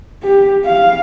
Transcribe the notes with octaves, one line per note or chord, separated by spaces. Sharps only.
G4
F5